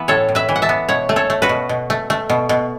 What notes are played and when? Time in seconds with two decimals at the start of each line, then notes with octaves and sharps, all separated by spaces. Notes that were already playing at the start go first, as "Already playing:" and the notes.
Already playing: E3 B3 B4 E5
0.08 A2 A4 C#5
0.29 A2
0.35 B4 E5
0.49 E3
0.56 F#5
0.62 E5 A5
0.69 B3
0.89 B2 C#5 F#5
1.09 A3
1.16 A4 C#5
1.30 A3
1.42 F#4 B4
1.49 B2
1.69 B2
1.90 A3
2.10 A3
2.30 B2
2.49 B2